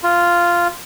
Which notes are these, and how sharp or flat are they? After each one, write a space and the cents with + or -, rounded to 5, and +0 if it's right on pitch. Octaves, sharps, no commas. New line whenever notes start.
F4 -5